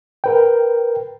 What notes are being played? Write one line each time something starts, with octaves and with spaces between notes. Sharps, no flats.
A#4 B4 G5